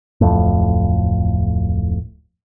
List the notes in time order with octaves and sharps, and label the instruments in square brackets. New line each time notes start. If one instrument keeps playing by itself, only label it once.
[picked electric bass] D1 F2 A2